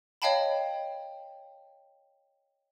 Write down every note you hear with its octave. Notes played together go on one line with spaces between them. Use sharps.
C#5 D#5 F5 G5 A5 B5